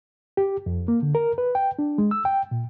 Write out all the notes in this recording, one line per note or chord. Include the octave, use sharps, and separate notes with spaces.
G4
F2
A#3
D3
A#4
B4
G5
D4
G#3
E6
G5
A#2